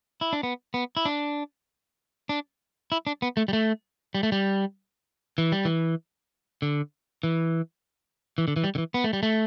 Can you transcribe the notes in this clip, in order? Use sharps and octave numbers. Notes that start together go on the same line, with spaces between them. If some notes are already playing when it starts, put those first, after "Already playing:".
E4
D4
B3
B3
E4
D4
D4
E4
D4
B3
A3
G3
A3
G3
A3
G3
E3
G3
E3
D3
E3
E3
D3
E3
G3
D3
E3
B3
A3
G3
A3